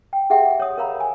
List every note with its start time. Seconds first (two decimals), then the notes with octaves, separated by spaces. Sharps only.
0.13 G5
0.30 G4 G#4 E5 F#5 G5
0.60 C#5 D#6
0.78 A#4 C#5 F5 A#5 B5
1.01 G#5